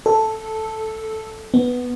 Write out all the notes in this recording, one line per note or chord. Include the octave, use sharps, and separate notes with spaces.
A4
B3